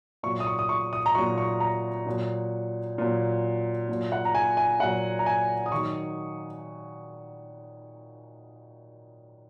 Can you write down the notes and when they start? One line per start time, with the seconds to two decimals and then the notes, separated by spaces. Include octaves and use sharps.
0.23 A#2 F#3 C#6
0.40 D#6
0.47 C#6
0.59 D#6
0.69 C#6
0.93 D#6
1.06 A#5
1.15 A#2 F#3 C#6
1.38 C#6
1.60 A#5
2.06 A#2 F#3
2.98 A#2 F#3
3.89 A#2 F#3
4.12 F#5
4.25 A#5
4.35 G#5
4.57 G#5
4.80 A#2 F#3 F#5
5.19 A#5
5.26 G#5
5.66 D#6
5.72 D#3 F#3 C#6